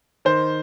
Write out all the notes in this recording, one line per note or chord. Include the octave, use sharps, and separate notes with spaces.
D#3 C5